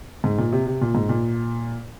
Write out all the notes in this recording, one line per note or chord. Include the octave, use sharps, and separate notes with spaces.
G#2
A#2
C3
C3
A#2
G#2
A#2